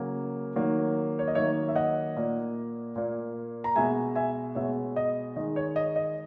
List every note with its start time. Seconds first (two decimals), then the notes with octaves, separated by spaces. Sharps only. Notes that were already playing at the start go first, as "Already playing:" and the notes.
Already playing: C#3 F#3 A#3
0.56 D#3 F#3 A#3
1.19 C#5
1.28 D#5
1.35 D#3 F#3 A#3 C#5 E5
1.68 E5
1.76 D#5 F#5
2.16 A#2 A#3
2.96 A#2 A#3
3.64 A#5
3.75 B2 G#3 E5 G#5
4.15 E5 G#5
4.55 B2 G#3 C#5 E5
4.96 D#5
5.36 D#3 G#3 D#5
5.56 C#5
5.76 D#5
5.96 D#5